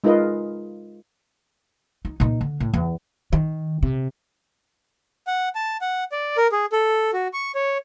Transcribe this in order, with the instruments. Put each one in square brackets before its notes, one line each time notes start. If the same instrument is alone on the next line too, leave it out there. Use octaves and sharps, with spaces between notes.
[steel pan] G#3 D#4 F4 A#4 B4 D#5
[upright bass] D#4
A#2 D#4
D3
A2
E2
D#3
C3
[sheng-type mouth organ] F#5
A5
F#5
D5
A#4
G#4
A4
F#4
C#6
C#5